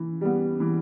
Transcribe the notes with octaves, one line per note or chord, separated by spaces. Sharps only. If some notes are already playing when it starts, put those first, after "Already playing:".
Already playing: E3
G3 B3
E3